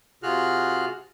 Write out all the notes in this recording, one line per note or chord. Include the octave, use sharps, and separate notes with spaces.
C3 F4 F#4 G#4 F6 F#6